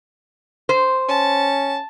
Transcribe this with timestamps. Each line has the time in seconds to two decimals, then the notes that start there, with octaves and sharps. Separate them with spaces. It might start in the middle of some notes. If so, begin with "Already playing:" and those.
0.69 C5
1.09 C#4 A5